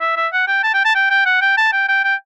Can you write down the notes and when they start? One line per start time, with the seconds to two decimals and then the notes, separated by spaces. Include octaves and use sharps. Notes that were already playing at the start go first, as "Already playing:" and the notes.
0.01 E5
0.17 E5
0.33 F#5
0.48 G5
0.63 A5
0.74 G5
0.85 A5
0.95 G5
1.10 G5
1.26 F#5
1.42 G5
1.57 A5
1.73 G5
1.89 G5
2.04 G5